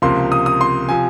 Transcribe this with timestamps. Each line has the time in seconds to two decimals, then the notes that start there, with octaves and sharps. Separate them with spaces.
0.02 C#2 C3 F3 A#3 C6
0.32 D#6
0.46 D#6
0.61 C6
0.89 C3 F3 G#5